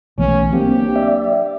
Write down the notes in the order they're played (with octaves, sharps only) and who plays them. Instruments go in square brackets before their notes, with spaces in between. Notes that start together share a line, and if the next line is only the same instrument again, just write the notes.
[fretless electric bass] B1 E3 A3 [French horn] C#4
[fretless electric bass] F#3 [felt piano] A#3 D4 [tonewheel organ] C4 [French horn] G4
[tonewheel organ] D5 E5